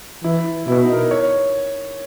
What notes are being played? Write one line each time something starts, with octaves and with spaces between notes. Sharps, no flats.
E3 E4
B2 E4
D#4
A#4
B4
C#5